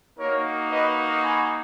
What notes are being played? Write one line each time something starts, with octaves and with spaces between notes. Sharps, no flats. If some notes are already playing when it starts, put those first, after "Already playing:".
A#3 D#4 F#4 A#4 C#5
B4 D#5
G#5 B5